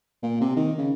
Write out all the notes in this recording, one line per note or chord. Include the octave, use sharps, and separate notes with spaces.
A#2
C3
D#3
C#3